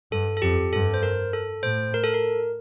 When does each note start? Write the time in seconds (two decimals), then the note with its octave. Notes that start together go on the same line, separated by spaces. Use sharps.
0.12 G2 A4
0.37 A4
0.42 F2 G4
0.73 G2 A4
0.94 C5
1.03 A#4
1.33 A4
1.63 A2 C5
1.94 A#4
2.04 A4
2.14 A#4